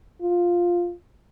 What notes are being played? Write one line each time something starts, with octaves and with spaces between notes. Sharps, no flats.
F4